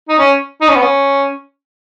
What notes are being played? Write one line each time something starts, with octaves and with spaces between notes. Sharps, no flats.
D#4
C#4
D#4
C#4
B3
C#4